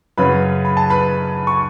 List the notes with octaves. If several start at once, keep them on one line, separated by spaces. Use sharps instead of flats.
F#2 C#3 F#3 C#4 B4 B5
B5
A5
B4 B5
C#6